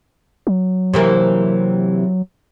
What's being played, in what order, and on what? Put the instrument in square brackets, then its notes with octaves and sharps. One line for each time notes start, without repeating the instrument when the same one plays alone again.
[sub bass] F#3
[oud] C3 E3 A#3